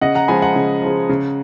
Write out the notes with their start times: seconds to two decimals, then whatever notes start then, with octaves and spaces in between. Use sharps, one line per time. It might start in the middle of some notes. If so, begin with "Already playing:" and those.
0.01 C#3 D#5 F#5
0.15 F#5 A#5
0.28 F3 G#3 G#5 B5
0.42 F#5 A#5
0.56 C#3
0.82 F3 G#3
1.09 C#3